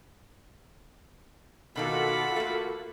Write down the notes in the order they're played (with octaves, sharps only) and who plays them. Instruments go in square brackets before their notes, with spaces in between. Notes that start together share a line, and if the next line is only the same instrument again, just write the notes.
[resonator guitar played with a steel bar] B2 D#3 A#3 [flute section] F4 F#4 A4 [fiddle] B5 D6
[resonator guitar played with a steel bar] A3 A#3